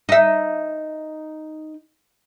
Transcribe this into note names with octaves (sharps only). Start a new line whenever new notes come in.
D#4 E5